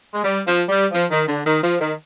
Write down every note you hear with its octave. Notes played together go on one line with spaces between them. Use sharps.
G#3
G3
F3
G3
F3
D#3
D3
D#3
F3
D#3